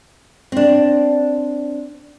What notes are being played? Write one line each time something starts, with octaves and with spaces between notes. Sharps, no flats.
C4 D4